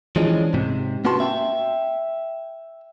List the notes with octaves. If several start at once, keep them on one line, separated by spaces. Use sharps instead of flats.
E3 F3 G#3 C#4 D4
G#2 C3
A#3 B3 C#4 F#4 A5 C6
E5 G5